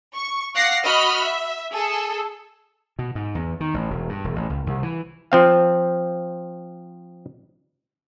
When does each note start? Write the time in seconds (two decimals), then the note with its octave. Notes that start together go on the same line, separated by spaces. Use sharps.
0.14 C#6
0.55 F5 F#5 D6 A#6 C7
0.85 F#4 D#5 B5 F6
1.22 E5
1.72 G#4 A4
2.99 B2
3.15 G#2
3.35 E2
3.60 D#3
3.74 A1
3.90 E1
4.09 G2
4.24 E1
4.36 A1
4.49 C#2
4.66 C2
4.83 E3
5.32 F3 C4 F5